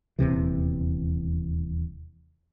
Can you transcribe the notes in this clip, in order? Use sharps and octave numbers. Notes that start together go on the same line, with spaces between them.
D#1 E2 C3 E3